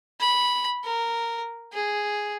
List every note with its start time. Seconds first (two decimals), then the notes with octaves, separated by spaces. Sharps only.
0.20 B5
0.85 A#4
1.74 G#4